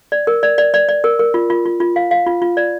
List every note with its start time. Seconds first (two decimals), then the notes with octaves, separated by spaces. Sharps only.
0.12 D5
0.27 A#4
0.43 D5
0.58 D5
0.74 D5
0.89 D5
1.04 A#4
1.19 A#4
1.34 F4
1.50 F4
1.65 F4
1.80 F4
1.96 F5
2.11 F5
2.27 F4
2.42 F4
2.57 D5